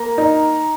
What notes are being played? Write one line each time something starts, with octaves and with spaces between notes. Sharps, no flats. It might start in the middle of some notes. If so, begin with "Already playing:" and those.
Already playing: A#3 A#5
D#4